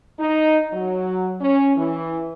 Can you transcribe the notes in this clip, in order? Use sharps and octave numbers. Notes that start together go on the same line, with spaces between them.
D#4
F#3
C#4
E3